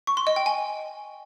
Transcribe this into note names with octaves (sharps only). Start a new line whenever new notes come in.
C#6
C6
D#5
G5
G#5